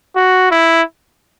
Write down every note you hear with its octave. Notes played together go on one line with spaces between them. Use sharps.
F#4
E4